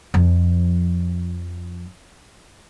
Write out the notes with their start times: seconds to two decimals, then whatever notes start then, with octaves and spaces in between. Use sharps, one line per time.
0.14 F2 F3